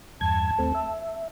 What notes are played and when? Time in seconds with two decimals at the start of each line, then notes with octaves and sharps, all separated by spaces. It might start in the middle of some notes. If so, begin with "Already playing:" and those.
0.21 E2 G2 A5 G#6
0.59 D#2 A3 C4
0.75 E5